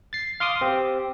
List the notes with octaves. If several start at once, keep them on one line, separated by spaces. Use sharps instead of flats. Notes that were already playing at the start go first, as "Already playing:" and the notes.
A6 C7
F5 C6 D6 D#6
C4 G4